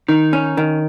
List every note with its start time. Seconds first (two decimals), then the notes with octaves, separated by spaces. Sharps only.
0.08 D#3 D#4
0.33 C#4
0.57 D#3